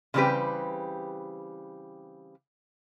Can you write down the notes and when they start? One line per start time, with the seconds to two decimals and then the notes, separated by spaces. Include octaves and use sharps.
0.14 C#3 E3 G3 C4 G4 B4